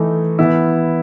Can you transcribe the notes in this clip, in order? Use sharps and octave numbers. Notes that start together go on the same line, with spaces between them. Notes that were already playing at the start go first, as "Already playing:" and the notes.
Already playing: E3 A3 D#4
E3 B3 E4